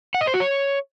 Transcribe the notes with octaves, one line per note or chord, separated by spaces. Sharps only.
F#5
D#5
C5
F#4
C#5